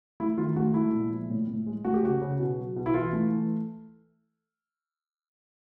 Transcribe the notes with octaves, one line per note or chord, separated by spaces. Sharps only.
A3 E4
D#3 F4
A3 F#4
G#3 E4
A#2
F3
A2
A2
G#3
A3 F#4
G4
C#3 F#4
C#3
B2
F#3
B2
E4
E3 F4
A3
E3